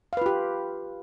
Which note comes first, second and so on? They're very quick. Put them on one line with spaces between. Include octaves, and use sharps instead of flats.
F5 B4 F4 G4